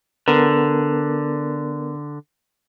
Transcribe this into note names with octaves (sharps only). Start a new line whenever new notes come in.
D3 B3 A#4